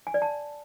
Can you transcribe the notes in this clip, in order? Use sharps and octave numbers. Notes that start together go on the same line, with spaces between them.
G#5
D5
A5